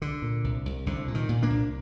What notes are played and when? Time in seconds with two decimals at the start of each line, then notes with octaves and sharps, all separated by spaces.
0.01 C2 D3
0.22 A#2
0.44 C2
0.66 C2
0.86 C2 D3
1.08 A#2
1.14 D#3
1.29 A#2
1.43 A#3 D4
1.50 C2